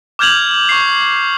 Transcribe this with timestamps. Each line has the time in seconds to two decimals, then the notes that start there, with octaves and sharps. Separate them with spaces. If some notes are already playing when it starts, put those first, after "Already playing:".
0.19 D6 F6 G6 G#6 F7 F#7
0.69 C#6 C7